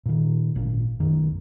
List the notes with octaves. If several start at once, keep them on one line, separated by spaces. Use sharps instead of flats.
A#2 D#3
G#1 A#2
B1 F#2 D#3